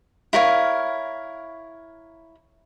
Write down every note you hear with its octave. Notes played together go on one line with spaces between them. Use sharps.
E4 A#4 C#5 F5